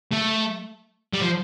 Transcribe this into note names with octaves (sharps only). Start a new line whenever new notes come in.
A3
G3
F3